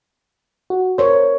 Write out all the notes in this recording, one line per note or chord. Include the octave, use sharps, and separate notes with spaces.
F#4
A#4 C5 C#5